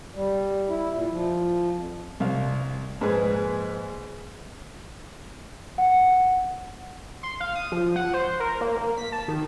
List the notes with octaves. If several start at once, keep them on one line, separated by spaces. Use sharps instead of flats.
G3
E4
A#2
F3
F2
C2 F5
A#1 G#2 G#4 B4
F#5
C6
F5
D#6
F3
F#5
C5
A#4
A#3
A#3
B6
A5
D#3